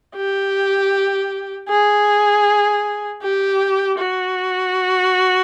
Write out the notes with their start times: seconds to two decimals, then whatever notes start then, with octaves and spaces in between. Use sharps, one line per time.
0.16 G4
1.69 G#4
3.22 G4
3.99 F#4